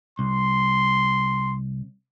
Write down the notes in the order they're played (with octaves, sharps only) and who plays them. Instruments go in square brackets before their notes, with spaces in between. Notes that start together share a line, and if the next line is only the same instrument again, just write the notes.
[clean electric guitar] C2 [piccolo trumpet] C6